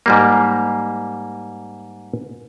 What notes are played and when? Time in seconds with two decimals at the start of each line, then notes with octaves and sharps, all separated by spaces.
0.06 G#2 G3 A#3